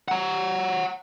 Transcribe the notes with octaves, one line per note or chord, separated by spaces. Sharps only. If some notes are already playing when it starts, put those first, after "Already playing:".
F#5 A#5